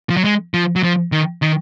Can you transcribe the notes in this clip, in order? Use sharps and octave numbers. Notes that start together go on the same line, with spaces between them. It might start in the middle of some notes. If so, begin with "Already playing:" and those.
F3
F#3
G#3
F3
F#3
F3
D#3
D#3